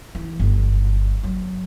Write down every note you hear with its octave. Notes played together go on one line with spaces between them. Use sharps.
E3
G1
F#3